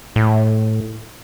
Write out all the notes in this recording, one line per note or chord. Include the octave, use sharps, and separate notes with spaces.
A2